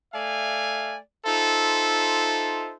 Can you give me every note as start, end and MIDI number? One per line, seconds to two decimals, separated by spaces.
0.13 0.97 57
0.13 0.97 74
0.13 0.97 76
0.13 0.97 77
0.13 0.97 80
1.25 2.73 63
1.25 2.73 65
1.25 2.73 69
1.25 2.73 72
1.25 2.73 76